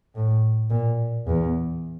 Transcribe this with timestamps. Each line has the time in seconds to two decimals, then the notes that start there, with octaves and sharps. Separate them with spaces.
0.15 A2
0.70 A#2
1.27 E2